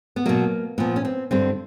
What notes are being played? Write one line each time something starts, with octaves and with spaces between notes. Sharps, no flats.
B3
B2 F#3 A#3
A#2 F3 B3
C#4
C4
G2 D3 G3 C4